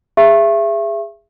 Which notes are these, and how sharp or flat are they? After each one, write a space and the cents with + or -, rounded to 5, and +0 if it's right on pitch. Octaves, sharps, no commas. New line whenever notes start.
G#4 -20 E5 +25 C#6 -35